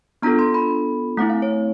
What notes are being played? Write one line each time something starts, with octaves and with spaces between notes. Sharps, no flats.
B3 D4 F4 A4 A#5
C6
B5
A3 C4 E4 F#5
F5
C#5